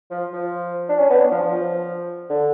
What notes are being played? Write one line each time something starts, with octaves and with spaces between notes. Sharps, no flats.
F3
F3
D4
C#4
B3
D4
F3
F3
D3